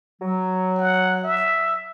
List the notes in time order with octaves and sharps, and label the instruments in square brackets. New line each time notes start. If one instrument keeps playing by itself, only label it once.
[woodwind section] F#3
[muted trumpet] F#5
E5